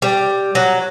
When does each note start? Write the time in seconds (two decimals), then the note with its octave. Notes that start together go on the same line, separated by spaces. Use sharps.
0.02 G3
0.55 F#3